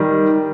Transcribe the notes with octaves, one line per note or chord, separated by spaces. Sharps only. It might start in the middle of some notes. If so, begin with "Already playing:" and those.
Already playing: D#3 G3